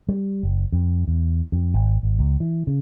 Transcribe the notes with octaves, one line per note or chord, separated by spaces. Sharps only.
G3
F#1
F2
E2
F2
G#1
G#1
C#2
E3
C#3